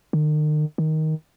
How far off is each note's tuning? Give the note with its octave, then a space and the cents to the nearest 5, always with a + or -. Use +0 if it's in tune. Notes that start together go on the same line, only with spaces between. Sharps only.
D#3 -40
D#3 +10